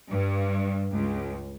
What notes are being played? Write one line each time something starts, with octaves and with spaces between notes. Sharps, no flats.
G2
C#2